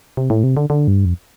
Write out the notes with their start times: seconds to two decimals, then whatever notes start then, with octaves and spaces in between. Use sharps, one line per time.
0.17 C3
0.30 A2
0.44 C3
0.57 D3
0.70 D3
0.88 G2
1.05 F2